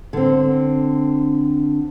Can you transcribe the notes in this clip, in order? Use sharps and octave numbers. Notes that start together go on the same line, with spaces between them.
D3 C4